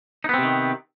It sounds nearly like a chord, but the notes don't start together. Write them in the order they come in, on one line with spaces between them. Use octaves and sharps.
D#4 B3 C4 C3 D#3